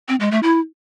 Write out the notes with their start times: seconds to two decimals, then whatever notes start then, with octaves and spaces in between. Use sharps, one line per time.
0.09 C4
0.20 G#3
0.31 A3
0.43 E4